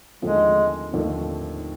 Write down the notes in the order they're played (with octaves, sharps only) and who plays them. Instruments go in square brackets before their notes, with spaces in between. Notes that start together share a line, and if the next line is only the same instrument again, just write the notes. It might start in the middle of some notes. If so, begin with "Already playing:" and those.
[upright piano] D#2 D3 F3 A3 C4 [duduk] G#3
[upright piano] D#2 D3 F3 A3 C4